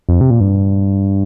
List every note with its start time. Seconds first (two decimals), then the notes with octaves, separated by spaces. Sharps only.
0.09 F2
0.21 C3
0.31 A#2
0.40 G2